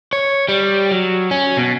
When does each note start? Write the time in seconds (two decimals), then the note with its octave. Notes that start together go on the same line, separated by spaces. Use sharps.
0.13 C#5
0.48 G3
0.91 F#3
1.31 C#4
1.57 B2